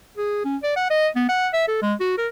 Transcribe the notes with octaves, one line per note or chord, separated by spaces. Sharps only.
G#4
C#4
D5
F#5
D#5
B3
F#5
E5
A4
G#3
F#4
A#4